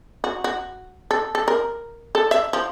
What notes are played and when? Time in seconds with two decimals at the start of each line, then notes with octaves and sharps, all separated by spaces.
0.24 F#4
0.44 F#4
1.11 A4
1.35 A4
1.48 A#4
2.15 A4
2.31 E5
2.53 F3